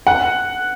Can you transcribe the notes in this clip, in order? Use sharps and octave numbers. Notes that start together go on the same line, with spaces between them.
F#5